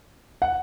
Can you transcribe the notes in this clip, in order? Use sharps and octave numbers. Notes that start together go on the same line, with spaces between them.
F#5